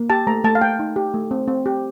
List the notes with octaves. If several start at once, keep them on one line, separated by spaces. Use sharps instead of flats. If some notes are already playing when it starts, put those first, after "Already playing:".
Already playing: A#3
G4 A5
A3 A#5
A3 A5
F5
A3 G5
D#4
G4
A3
C4
C4
G4